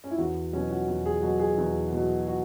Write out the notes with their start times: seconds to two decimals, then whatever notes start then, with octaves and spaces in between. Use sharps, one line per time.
0.04 C#4
0.11 E4
0.18 E2 F#4
0.53 F#3 C#4
0.57 B2
0.71 F#4
0.88 E2
1.06 G#4
1.22 B2 F#3 F#4
1.40 G#4
1.58 E2
1.92 B2 F#3
2.28 F#4